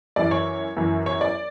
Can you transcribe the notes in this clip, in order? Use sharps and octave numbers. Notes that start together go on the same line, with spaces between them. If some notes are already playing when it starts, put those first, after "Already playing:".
F#2 E3 D5
C#5
F#2 E3
C#5
D5